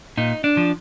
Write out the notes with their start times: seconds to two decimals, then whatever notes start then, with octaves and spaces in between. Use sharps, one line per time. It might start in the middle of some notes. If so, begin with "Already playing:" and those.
0.17 A#2 D#4
0.44 D4
0.57 F3